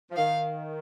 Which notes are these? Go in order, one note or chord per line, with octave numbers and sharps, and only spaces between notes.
F3
D#3 F5